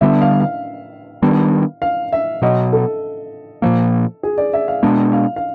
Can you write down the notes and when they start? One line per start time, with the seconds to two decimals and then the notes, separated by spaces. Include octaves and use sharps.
0.01 D3 G3 B3 D4 E5
0.22 F5
0.41 F5
1.22 D#3 G3 B3 D4
1.82 F5
2.13 E5
2.42 B2 F#3 B3 D#5
2.73 A4
3.62 A#2 F3 A#3
4.23 G#4
4.38 D5
4.54 E5
4.68 F5
4.83 B2 G#3 B3 D4
5.13 F5
5.36 F5